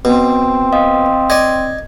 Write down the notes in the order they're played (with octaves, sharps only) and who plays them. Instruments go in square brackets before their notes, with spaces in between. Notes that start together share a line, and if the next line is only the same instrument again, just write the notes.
[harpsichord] B2 [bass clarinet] C4
[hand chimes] D#5 F5 D#6
[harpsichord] D5 D#5 [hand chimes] G#6